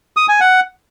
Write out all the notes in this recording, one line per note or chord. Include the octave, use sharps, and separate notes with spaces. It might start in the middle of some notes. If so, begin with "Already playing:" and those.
D#6
G#5
F#5